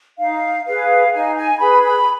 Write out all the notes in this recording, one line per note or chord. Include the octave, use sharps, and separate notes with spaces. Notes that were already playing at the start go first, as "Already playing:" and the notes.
D#4 F5
G#4 B4 F5
D#4 G#5
G#5
G#4 B4 B5
B5